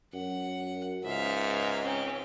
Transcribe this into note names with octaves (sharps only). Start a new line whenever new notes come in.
F#2 F#5
C#2 G#2 E5 F5
C4 C#4